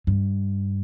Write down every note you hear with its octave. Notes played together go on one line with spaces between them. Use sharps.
G2